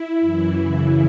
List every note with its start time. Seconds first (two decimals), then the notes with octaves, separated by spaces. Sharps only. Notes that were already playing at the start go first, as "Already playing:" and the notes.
Already playing: E4
0.21 F#2 E3
0.58 F#2 C#3 E3 E4